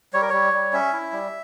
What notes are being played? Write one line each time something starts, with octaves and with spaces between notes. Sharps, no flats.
G3 C#5
A#4
G3 C#5
G3
C#4 E5
E4
G3